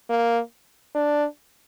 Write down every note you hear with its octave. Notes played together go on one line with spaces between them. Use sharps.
A#3
D4